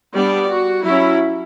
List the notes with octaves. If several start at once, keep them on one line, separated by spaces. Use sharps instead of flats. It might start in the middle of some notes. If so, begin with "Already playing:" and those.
G3 B3 D4 D5
F#4
F#3 C#4 E4